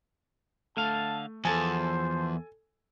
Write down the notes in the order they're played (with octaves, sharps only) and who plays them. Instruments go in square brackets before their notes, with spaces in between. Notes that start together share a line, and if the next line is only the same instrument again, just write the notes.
[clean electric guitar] D3 F5 [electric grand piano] A3 [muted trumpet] A5
[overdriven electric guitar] E2 [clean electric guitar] F3 A5 [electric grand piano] A4 G#5 [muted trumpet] C5